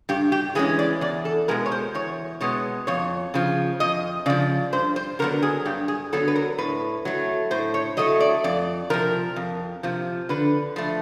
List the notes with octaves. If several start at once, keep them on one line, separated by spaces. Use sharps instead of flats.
G2 G4
G4
E3 G#3 C#4 G#4
D5
E2 D5
A4
B2 G#3 B3 A#4
C#5
C5
E2 C#5
B2 G#3 B3 C#5
F2 C#5
C#3 F3
F2 D#5
C#3 F3 D5
G2 C5
C5
D3 F#3 B3 A#4
G#4
G2 G4
G#4
D3 F#3 B3 A4
B4
A#4
A2 B4
F#3 A3
A2 C5
C#5
F#3 A3 D#5
D5
F2 D5
C3 F3 A#4
F2
C3 F3
D3 B4
F3 A3